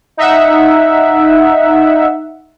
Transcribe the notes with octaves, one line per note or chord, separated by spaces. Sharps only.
D#4 E5 F#5